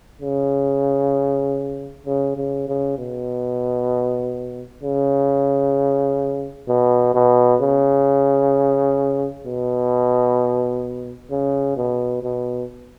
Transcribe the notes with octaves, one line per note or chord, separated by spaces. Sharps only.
C#3
C#3
C#3
C#3
B2
C#3
B2
B2
C#3
B2
C#3
B2
B2